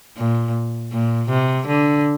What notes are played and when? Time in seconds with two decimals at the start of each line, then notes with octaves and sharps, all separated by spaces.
0.17 A#2
0.92 A#2
1.29 C3
1.67 D3